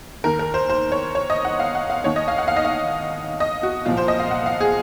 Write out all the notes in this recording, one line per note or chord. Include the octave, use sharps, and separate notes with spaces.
D#2 D#3 A#4
A#4
C5
C5
C#5
C#5
D#5
F#5
F5
F#5
F5
D#2 D#3 C#5
D#5
F5
F#5
F5
D#5
F5
D#5
F#4
C2 A#2 F3 F4
C5
D#5
F5
F#5
F5
G#4